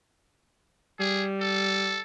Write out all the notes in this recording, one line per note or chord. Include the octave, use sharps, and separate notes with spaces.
G3 G#4
A4